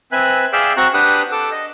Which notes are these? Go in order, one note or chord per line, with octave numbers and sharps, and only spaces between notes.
C4 B4 E5 G#5 F#6
G#4 D5 E5 F5 G5 E6
C4 F#4 A#5 C#6 F#6
D4 G4 B4 F#5 D#6
A4 D6 E6
D#5